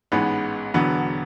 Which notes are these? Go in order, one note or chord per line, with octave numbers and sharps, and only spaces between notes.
A1 G#2 G#3 B3
E1 E2 D3 F#3 B3